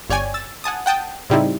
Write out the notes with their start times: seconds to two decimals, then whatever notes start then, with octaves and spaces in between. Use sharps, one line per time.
0.10 G1 C#5 D5 G5 G#5
0.34 E6 A6
0.64 F#5 G#5 A5 D#6
0.86 F#5 G5 A5 D#6
1.30 A2 C#3 G3 C4 D#4 E4